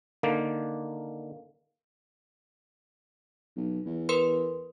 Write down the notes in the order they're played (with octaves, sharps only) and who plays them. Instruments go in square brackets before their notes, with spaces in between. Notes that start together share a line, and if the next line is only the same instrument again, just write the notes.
[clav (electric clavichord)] D3 D#3 A#3
[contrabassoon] B1
E2
[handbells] A#4 B4 C6